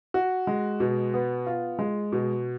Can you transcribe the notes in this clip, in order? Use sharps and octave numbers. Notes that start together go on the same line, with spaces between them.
F#4
G#3
B2
B3
F4
G#3
B2